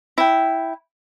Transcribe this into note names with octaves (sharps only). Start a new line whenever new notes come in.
E4 G5